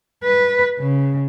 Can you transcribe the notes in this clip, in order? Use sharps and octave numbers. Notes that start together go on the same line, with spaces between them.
B4
C#3